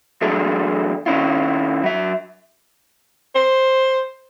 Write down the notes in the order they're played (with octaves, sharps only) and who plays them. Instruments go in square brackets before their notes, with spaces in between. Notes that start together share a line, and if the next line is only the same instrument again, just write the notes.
[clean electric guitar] E3 F#3 A3 D4 G#4 A4
D#3 C#4 E4 F4
F#3 E5
[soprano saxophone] C5